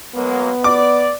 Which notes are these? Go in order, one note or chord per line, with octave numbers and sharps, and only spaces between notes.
F#3 G#3 A#3 B3
D5 D6